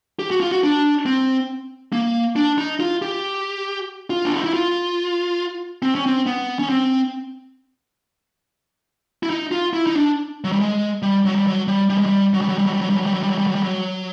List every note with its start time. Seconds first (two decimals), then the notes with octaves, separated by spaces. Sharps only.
0.19 G4
0.31 F#4
0.41 F4
0.52 F#4
0.63 D4
1.06 C4
1.92 A#3
2.36 D4
2.58 D#4
2.80 F4
3.02 G4
4.10 F4
4.25 D4
4.34 D#4
4.44 E4
4.53 F4
5.82 C4
5.95 C#4
6.06 C4
6.26 B3
6.59 C#4
6.69 C4
9.23 E4
9.30 D#4
9.51 F4
9.73 E4
9.87 D#4
9.95 D4
10.44 F#3
10.52 G3
10.60 G#3
11.02 G3
11.25 F#3
11.35 G3
11.47 F#3
11.68 G3
11.90 G3
11.98 G#3
12.06 G3
12.34 F#3
12.41 G3
12.49 F#3
12.58 G3
12.66 F#3
12.73 G3
12.81 F#3
12.90 G3
12.97 F#3
13.06 G3
13.14 F#3
13.23 G3
13.30 F#3
13.38 G3
13.47 F#3
13.55 G3
13.63 F#3